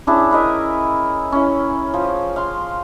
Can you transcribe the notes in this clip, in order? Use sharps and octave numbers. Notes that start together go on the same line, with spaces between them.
C#4 D4 E4 G#4
E4 A#4 D#5 E5
C#4 E4
F3
F5 C6